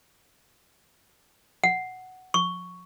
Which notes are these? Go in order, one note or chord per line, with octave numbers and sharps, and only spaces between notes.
F#5
C#6